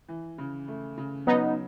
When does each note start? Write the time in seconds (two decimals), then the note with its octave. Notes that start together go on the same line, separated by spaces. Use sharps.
0.08 E3
0.38 C#3
0.68 A3
0.97 C#3
1.27 F#3 B3 D#4